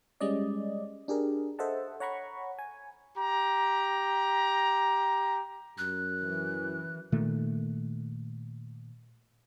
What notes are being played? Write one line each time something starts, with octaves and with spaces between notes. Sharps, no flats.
G3 G#3 C#4 D5 D#5
D4 G4 G#4 A#4
A4 C5 D#5 E5 F#5 A5
C#5 F#5 A#5 B5 C#6
G#5
G4 A#5
F#2 F#6
E3
A#2 D#3 A3